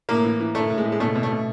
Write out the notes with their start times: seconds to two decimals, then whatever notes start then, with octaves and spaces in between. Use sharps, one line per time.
0.09 A2 A#3
0.24 E3
0.40 E3
0.55 A2 A3
0.70 A2
0.78 G#3
0.85 A2
0.92 G#3
1.00 B2 A3
1.15 B2
1.23 A3
1.31 B2